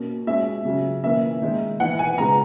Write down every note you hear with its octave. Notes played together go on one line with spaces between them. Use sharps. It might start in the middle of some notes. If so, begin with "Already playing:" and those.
Already playing: B2 A#3 C#4
B2 G#3 C#4 E5
C#3 F#3 C#4
E3 A#3 C#4 E5
D#3 G#3 D#4
E3 B3 D#4 F#5
G#5
C#3 G#3 B3 A#5